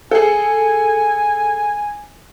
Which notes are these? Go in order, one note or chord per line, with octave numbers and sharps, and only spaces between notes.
G#4 A4 G#5